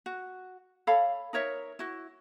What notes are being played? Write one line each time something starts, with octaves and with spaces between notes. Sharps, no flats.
F#4
A4 C#5 F5 B5
D#4 A#4 C#5 E5
E4 F#4